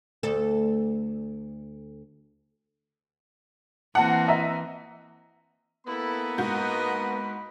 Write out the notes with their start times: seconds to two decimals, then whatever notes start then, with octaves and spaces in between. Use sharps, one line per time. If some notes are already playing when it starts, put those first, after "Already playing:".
0.23 D2 A4
3.95 E3 A#3 C4 F#5 A5
4.28 D#5 E5 A#5
5.86 A#3 B3 E4 A4 B5
6.38 G#2 F#4 D#5 G6